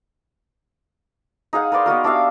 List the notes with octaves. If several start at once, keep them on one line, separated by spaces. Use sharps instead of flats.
D#4 G#4 F5 F#5
A#4 B4 D5 C6
B3 D#4 F#4 A#4
D4 G4 E5 F5